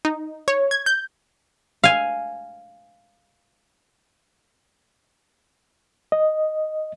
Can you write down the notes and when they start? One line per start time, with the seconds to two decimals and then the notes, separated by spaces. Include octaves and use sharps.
0.05 D#4
0.48 C#5
0.71 G#6
0.86 G6
1.84 F5 G#5
6.12 D#5